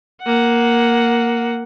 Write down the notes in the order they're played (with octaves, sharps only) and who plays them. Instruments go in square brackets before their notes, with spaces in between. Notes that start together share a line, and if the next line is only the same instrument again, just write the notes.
[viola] A#3 F#5